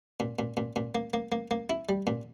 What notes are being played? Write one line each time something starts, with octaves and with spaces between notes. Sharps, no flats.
A#2
A#2
A#2
A#2
A#3
A#3
A#3
A#3
E4
G3
A#2